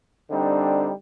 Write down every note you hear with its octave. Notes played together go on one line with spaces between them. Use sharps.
D3 G3 C4 D4 D#4